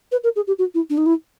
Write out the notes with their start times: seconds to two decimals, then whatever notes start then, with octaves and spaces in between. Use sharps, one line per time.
0.12 B4
0.24 A#4
0.36 G#4
0.47 G4
0.59 F#4
0.74 E4
0.90 D4
0.98 D#4
1.06 E4